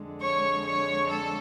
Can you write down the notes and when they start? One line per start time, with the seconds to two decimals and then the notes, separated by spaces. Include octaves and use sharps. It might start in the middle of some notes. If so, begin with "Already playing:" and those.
Already playing: F2 D3 G#3
0.21 C#5 C#6
0.65 C#5 C#6
1.09 A4 A5